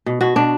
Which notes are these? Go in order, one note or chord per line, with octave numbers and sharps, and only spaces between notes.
B2
B2 F#4
B2 D4